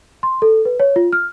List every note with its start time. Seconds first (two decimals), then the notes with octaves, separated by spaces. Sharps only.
0.23 C6
0.42 A4
0.65 B4
0.80 C#5
0.96 F4
1.13 F6